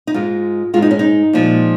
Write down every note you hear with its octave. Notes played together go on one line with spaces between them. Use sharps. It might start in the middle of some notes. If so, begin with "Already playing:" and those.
D#4
G#2 G#3 F4
G#2 G#3 F4
D#4
C#4
D#4
A#2 F3 G#3